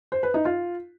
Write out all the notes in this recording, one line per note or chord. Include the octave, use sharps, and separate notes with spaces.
C5
B4
D#4
F4